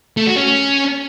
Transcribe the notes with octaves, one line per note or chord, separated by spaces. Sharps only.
A3
F#4
C#4